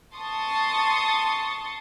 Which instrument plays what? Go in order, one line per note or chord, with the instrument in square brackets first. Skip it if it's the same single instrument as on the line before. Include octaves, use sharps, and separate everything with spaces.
[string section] A5 C6 C#6 D#6 A6